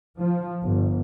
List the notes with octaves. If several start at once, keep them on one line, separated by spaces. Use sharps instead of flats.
F3
G1